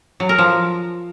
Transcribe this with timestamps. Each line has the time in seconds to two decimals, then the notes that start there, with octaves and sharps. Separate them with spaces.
0.20 F#3
0.29 A#4
0.38 F3